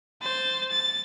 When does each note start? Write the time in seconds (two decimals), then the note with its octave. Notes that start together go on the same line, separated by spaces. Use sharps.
0.22 C5 A6
0.70 A6